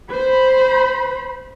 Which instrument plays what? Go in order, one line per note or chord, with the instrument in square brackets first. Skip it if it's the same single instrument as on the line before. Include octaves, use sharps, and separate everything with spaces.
[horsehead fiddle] C5 B5